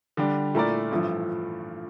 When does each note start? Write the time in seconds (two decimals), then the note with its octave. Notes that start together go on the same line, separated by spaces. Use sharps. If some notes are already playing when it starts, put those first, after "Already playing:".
0.17 D3 G3 D4
0.55 A#2 A3 E4 A#4 D5
0.91 A1 G2 F3 A3